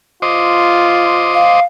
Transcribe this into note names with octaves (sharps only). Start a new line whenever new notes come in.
F4 C5 D#5 D6
F5